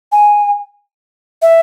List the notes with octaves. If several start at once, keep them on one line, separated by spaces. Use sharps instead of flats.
G#5
E5